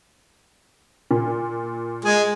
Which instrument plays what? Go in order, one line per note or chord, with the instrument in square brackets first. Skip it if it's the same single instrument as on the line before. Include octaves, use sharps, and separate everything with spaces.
[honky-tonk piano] A#2
[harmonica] G#3 G#4